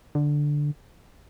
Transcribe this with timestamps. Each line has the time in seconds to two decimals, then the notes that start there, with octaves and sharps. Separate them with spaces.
0.15 D3